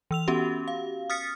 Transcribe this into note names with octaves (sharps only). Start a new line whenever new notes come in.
E3 E6 F7
B3 C#4 F#4 G4
F5
D#6 F6 A6 B6 C#7